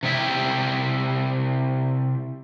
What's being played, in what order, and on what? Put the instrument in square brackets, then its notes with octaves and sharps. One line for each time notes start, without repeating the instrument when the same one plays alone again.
[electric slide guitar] C3 G3 E4 G4